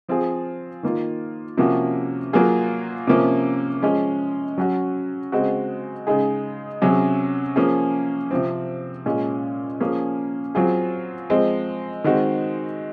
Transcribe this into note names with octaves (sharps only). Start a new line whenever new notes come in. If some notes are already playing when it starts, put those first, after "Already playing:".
F3 C4 F4 G#4
D#3 A#3 F4
C3 F3 A#3 C#4 F#4
F#3 A#3 F4 G#4
C3 F3 A#3 C#4
F3 G#3 C#4
F#3 C#4 F#4
C#3 G#3 C4 F#4
C#3 G#3 D#4 G#4
C3 F#3 C#4 G#4
F3 A#3 C#4 G#4
C3 F3 C4
A#2 G#3 C#4
F3 A#3 C#4 G#4
F#3 C4 F4 G#4
F3 G#3 C4
D#3 G#3 C4 F#4